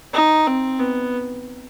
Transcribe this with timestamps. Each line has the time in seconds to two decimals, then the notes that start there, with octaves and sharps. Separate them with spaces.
0.14 D#4
0.47 C4
0.79 B3